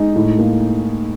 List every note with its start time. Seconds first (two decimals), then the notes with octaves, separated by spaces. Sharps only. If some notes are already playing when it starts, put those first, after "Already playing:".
Already playing: G#3 D#4
0.16 A2
0.38 A#3